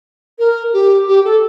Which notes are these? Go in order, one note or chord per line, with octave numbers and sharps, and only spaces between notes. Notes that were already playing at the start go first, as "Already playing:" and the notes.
A#4
G4
G4
A4